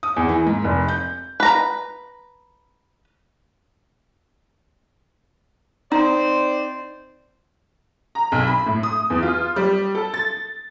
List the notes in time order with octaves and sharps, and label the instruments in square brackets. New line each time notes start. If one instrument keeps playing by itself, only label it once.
[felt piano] D#6
E2
E3
G#2
F1
G6
[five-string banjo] B4 A#5
[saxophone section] C4 C5 D5 [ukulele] D#4
[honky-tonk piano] A#5
B1
B5
A2
D#6
E2
F4
G3
A4
A6